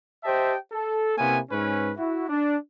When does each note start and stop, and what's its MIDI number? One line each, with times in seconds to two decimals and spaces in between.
0.24 0.55 67
0.24 0.55 72
0.24 0.55 75
0.24 0.55 76
0.24 0.55 79
0.24 0.55 81
0.72 1.14 69
1.17 1.38 48
1.17 1.38 58
1.17 1.38 59
1.17 1.38 61
1.17 1.38 64
1.17 1.38 80
1.51 1.92 44
1.51 1.92 61
1.51 1.92 71
1.98 2.27 64
1.98 2.27 66
2.29 2.55 62